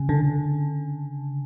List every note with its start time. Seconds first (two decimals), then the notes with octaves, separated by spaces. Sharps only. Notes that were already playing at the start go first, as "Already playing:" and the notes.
Already playing: C#3
0.09 D3